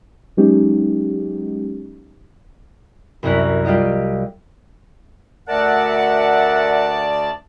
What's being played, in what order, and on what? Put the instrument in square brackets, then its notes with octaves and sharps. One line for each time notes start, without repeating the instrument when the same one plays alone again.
[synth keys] F#3 G#3 B3 C#4 D#4 G4
[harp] C2 F#2 E4 A#5 F#6 B6
G3 F4 G4 D#5
[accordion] D2 D5 A5 [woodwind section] A#4 E5 F#5